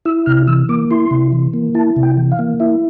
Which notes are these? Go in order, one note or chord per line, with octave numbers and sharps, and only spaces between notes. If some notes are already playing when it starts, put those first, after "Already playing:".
E4 E6
C3 F6
E3 E6
A#3 D6
E4 C6
C3
E3
A#3
E4 A5
C3
G5
E3
F5
A#3
E4 E5